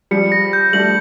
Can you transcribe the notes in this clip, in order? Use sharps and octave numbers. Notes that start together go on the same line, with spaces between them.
F3 G3 C#7
A#6
G6
G3 A3 F#7